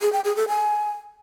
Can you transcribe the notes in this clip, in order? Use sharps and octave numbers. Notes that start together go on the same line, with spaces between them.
G#4
G5
G#4
A4
G#5